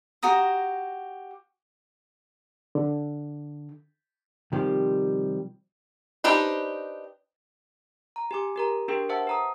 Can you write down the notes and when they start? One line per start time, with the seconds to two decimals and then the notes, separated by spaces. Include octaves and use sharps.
0.23 F#4 G4 A#5 D#6
2.75 D3
4.52 C3 D#3 F3 G3 G4
6.24 D4 D#4 G4 B4 C5
8.16 A#5
8.31 G4 G#5 D6
8.56 G4 A#4 A#5
8.88 D4 G4 G#4 A#4 G5
9.09 C5 E5 F#5 A5 E6
9.27 B4 A#5 D#6